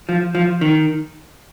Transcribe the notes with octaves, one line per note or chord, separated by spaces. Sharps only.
F3
F3
D#3